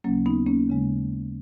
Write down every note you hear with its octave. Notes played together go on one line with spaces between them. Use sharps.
D#2 C#3 F#3 A#3 C#4
B3 D#4
A#3 C#4
D#2 C#3 G#3